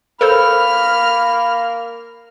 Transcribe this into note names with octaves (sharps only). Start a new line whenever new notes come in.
A#3 A4 A#4 C5 B5 F6